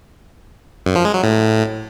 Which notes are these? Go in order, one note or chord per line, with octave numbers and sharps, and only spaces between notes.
F#2
F3
G#3
F#3
A2